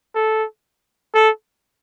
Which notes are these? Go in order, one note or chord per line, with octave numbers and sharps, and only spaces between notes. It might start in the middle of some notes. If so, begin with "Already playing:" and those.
A4
A4